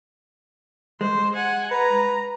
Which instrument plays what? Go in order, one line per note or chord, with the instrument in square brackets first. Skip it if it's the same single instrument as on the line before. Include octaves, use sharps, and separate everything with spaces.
[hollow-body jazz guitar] G#3 [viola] C5
[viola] F#5 G#5
[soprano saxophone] B4 [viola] A#5